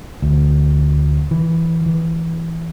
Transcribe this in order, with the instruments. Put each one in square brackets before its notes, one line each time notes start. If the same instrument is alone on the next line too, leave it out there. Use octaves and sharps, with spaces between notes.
[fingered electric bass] D2
E3
E3